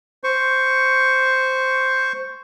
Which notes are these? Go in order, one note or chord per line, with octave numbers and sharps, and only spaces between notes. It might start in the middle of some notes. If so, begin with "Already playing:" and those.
C5 C#6